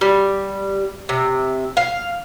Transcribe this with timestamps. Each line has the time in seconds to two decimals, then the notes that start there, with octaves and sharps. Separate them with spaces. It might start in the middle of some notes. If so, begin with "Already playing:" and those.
0.01 G3
1.09 C3
1.77 F5